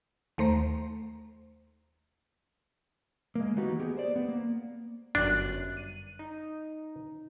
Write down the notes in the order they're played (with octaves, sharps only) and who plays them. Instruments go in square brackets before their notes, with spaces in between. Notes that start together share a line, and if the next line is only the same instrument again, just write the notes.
[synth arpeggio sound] D#2 A3 C5 A#5
[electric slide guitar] G#3 A#3
E3 A#3 B3 D#4 F#4 G4
B3 G4 G#4
C5 D5
B3
A#3
[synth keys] G1 F#2 F#6 [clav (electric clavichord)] D4
[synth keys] D#7
D#4